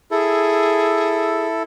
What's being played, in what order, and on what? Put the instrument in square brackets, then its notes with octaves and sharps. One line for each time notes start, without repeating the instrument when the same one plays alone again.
[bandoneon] E4 A4 [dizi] G#4